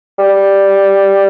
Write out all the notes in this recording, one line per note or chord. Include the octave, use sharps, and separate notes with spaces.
G3